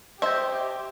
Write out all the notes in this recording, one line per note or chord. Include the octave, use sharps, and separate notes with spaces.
G4 C5 D#5 E5 C6 G6